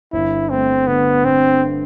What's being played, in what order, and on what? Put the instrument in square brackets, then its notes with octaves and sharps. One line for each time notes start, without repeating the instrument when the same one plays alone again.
[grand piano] G1 [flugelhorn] E4
[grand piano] A3 [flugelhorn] C4
[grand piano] D3 [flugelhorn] B3
[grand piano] G2 [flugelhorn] C4